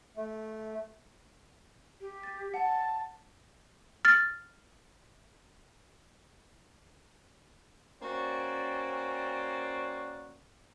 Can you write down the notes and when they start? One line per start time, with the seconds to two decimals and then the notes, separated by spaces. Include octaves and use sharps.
0.17 A3
2.01 G4
2.23 A6
2.54 F#5 A5
4.05 F6 A6
8.02 A#3 C#4 F#4 C5 D5 G5